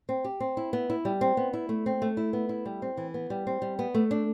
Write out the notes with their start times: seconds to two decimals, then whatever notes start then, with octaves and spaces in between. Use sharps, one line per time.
0.09 C4
0.24 G4
0.40 C4
0.57 E4
0.73 B3
0.90 E4
1.05 G3
1.21 C4
1.37 B3
1.53 E4
1.69 A3
1.86 C4
2.02 A3
2.17 E4
2.33 B3
2.49 E4
2.66 G3
2.82 C4
2.97 E3
3.14 B3
3.30 G3
3.47 C4
3.62 G3
3.79 B3
3.94 A3
4.11 D4